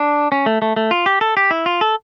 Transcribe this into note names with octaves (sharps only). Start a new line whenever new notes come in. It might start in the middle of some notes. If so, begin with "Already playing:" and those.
Already playing: D4
C#4
A3
A3
A3
F4
G4
A4
G4
E4
F4
A4